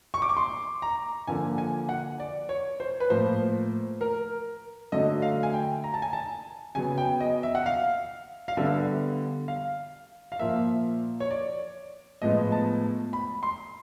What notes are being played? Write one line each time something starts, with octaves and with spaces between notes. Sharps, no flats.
C#6
D6
C#6
C6
A#5
D3 F3 A#3 G#5
G#5
F#5
D5
C#5
C5
B4
A2 F3 A#3 C5
A#4
D3 F#3 A3 D#5
F5
G#5
G5
A#5
A5
G#5
A5
C#3 F#3 B3 G#5
G5
D#5
E5
F#5
F5
F5
D3 G3 B3 E5
F5
F5
A#2 F3 A#3 E5
C#5
D5
A2 F3 G#3 B3 D#5
A5
B5
C6